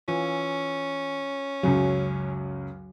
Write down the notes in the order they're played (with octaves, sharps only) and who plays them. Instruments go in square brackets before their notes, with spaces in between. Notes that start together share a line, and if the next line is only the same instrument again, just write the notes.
[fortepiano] E3 [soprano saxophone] C#4 [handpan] F4
[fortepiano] C#2 F#2 C#3 [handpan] F#3